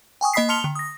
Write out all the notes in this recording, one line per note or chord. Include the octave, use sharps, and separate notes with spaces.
G5 G#5 C#6 D#6
A#3 D#5 B5 D#6 B6 C7
A5 C6 F6 C#7 F7 G7
D3
D#6 A#6